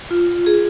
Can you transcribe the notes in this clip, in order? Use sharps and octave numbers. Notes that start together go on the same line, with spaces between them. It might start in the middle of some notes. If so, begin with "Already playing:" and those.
F4
G#4